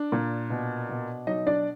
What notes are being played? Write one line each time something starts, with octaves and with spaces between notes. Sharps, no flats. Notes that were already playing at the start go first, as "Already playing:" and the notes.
Already playing: D4
A#2
B2
B2
F#3 D#4 D#5
D4 D5